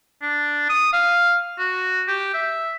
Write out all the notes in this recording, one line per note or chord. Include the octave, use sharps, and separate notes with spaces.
D4
D#6
F5
F#4
G4
E5